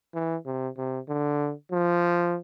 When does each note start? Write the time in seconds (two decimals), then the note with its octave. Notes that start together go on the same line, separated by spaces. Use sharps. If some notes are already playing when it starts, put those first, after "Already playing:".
0.14 E3
0.46 C3
0.77 C3
1.08 D3
1.72 F3